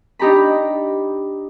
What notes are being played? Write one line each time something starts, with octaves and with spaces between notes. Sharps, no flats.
D4 D#4 G4 A#5 B5